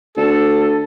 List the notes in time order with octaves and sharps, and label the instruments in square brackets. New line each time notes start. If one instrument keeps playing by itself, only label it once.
[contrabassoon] D2 [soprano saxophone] A4